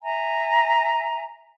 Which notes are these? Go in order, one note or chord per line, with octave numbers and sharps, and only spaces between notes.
E5 G#5 A#5